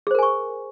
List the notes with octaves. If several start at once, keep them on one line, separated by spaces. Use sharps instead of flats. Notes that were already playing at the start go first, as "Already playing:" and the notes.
G#4 A#4 C5 G#5 C#6